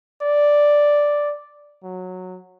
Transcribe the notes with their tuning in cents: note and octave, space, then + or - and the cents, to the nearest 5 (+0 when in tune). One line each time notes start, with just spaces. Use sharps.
D5 +0
F#3 -10